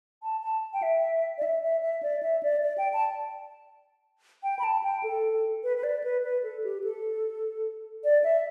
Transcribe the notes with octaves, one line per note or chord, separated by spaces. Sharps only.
A5
A5
G5
E5
D5
E5
E5
E5
D5
E5
D5
D5
G5
A5
G5
B5
A5
G5
A4
B4
B4
D5
B4
B4
A4
G4
A4
D5
E5